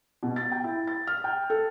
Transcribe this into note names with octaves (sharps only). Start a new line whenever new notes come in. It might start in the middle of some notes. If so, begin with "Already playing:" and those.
B2
A6
G5
E4
A6
F6
G5
A4